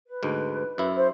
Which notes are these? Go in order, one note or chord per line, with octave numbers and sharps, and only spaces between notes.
B4
D2 G#2
F#2 E4
C5